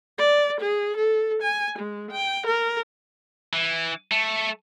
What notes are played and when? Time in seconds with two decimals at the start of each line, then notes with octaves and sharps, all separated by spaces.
0.18 D5
0.61 G#4
0.97 A4
1.42 G#5
1.79 G#3
2.11 G5
2.47 A#4
3.53 E3
4.12 A3